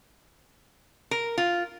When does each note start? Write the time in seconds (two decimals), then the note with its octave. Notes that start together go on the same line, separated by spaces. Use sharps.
1.11 A#4
1.38 F4